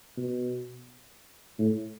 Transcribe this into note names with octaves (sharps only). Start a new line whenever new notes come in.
B2
A2